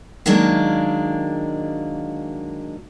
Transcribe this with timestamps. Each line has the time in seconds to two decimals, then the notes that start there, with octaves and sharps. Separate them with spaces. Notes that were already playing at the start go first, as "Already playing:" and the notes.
0.26 D#3 F#3 G#3 A#3 D4